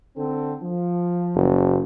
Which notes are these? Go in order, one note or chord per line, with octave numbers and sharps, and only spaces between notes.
D3 C4 A4
F3
F#1